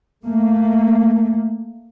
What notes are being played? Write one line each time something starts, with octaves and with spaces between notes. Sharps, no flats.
A3 A#3